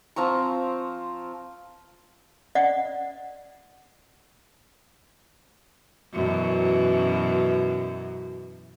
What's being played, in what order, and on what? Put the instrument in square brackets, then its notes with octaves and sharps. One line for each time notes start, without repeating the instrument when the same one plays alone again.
[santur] F3 C4 A#5 C#6
[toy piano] D5 D#5 F#5
[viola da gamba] F#2 B2 E3